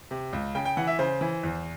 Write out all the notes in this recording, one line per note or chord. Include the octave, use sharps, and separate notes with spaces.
C3
C#2
C#3 G5
G5
E3 F#5
E5
C#3 C5
E3
E2